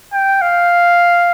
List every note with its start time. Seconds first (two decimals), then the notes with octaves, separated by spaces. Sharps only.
0.13 G5
0.42 F5